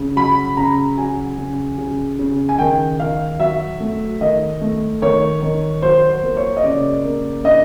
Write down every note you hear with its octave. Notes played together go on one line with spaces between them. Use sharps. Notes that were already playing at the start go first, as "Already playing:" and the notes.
Already playing: C#3
F#3 B5
C#3 A#5
F#3 G#5
C#3
C#3
C#3
G#5
D#3 G5
D#3 F5
F#3 E5
A3
D#3 D#5
A3
D#3 C#5
D#3
F#3 C5
C5
A#3
C#5
D#5
C#3 D5
A#3
D4 D#5